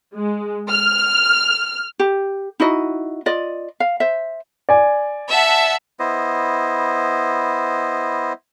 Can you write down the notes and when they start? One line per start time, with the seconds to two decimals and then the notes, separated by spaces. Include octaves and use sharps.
0.13 G#3
0.68 F6
1.99 G4
2.60 D#4 E4 F#4 D#5
3.26 F4 D5 D#5
3.80 F5
4.00 C5 E5
4.69 D5 G#5
5.29 E5 F#5 A5
5.99 B3 E4 C5 D#5